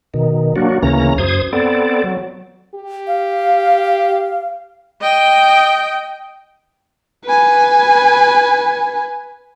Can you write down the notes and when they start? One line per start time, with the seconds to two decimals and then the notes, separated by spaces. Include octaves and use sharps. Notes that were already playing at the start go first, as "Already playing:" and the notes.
0.14 B2 D#3
0.56 F#3 A#3 D4 F#4
0.83 D2 C#3 E3 A#3 C#4 A#5
1.18 F#2 C5 D#6 G#6
1.53 B3 C4 A4 D5
2.04 F#3
2.75 G4
3.07 F5
5.01 D#5 G5
7.25 B4 G#5